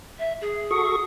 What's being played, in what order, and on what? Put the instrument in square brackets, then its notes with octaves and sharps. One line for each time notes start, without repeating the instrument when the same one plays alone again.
[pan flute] E5
G#4
[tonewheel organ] F#4 A4 C#6 [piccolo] D#6